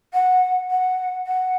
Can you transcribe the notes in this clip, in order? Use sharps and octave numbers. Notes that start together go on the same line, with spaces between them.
F#5
F#5
F#5